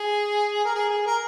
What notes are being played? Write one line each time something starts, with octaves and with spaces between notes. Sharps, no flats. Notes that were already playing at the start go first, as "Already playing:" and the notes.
Already playing: G#4
A#4
G#4
G#4
A#4